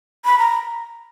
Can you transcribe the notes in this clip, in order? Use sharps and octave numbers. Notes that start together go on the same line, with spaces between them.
B5
A#5